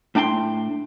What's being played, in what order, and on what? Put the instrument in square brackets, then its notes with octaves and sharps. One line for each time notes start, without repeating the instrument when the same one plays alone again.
[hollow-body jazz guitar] A2 D4 G5 A5 C6